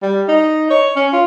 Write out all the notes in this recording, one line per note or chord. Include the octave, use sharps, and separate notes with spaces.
G3
D#4
C#5
C#4
F4